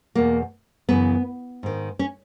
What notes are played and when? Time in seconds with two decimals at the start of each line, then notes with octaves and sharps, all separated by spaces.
0.15 E2 B2 A#3
0.89 F#2 C#3 E3 B3
1.63 G#2 D#3
1.99 C#4